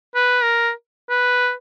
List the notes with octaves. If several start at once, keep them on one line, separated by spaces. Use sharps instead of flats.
B4
A#4
B4